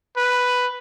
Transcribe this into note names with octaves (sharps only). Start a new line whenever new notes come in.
B4